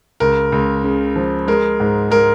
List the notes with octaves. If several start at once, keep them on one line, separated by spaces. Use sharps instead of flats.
C#2 A#4
C#2
C#3
F3
G#3 A#4
G#2
G#3 A#4